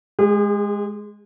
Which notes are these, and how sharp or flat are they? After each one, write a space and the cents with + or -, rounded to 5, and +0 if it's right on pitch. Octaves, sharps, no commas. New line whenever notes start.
G#3 +0 G#4 -45